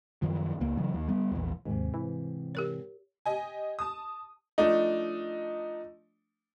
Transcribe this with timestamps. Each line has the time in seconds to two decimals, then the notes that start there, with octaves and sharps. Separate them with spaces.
0.22 F#2 D#3 F3
0.60 C#2 A#3
0.77 C#3 E3 F#3 C#4
0.93 D#2
1.08 G3 B3
1.32 A#1 E2
1.65 D#2 G#2 C3
1.94 E3
2.55 G4 A#4 C#5
3.25 G4 D#5 G#5
3.79 A5 D#6
4.58 F3 A3 D4 D#4